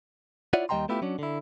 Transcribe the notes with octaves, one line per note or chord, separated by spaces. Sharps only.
E4 F4 C#5 D5 E5 F#5
D#2 G3 D#5 G5 A#5 C6
A3 B3 E4 F4 G4
F#3 C#4 D4
D3 E4